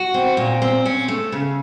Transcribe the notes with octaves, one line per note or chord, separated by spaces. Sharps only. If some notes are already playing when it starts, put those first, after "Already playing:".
Already playing: F#4
C4
A#2
C4
C#4
A3
C#3